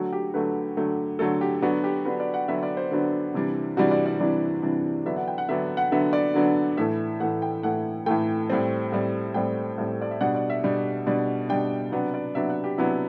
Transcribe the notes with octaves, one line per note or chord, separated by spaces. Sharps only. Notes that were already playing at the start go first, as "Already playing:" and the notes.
Already playing: D3 F#3 A3 F#4
G4
D3 F#3 A3 B4
D3 F#3 A3
D3 F#3 A3 A4
G4
D3 F#3 B3 D4 F#4
G4
D3 F#3 B3 D4 B4
D5
F#5
D3 F#3 B3 D4 E5
D5
C5
D3 F#3 B3 D4
C3 E3 G3 D4
C3 E3 G3 D4 F#4
D5
D5
C3 E3 G3 D4
C3 E3 G3 D4
D3 F#3 B3 D4 E5
F#5
G5
F#5
D3 F#3 B3 D4 E5
F#5
D3 F#3 B3 D4 E5
D5
D3 F#3 B3 D4
A2 E3 A3 E5
A2 E3 A3 F#5
G5
A2 E3 A3 F#5
A2 E3 A3 G5
A2 G3 C4
A2 G3 C4
A2 G3 C4 G5
A2 G3 C4
D5
E5
B2 G3 D4 F#5
D5
E5
B2 G3 D4
B2 G3 D4
B2 G3 D4 G5
C3 F#3 B3 D4 F#5
D5
C3 F#3 B3 D4 E5
F#5
G4
C3 F#3 B3 D4 E4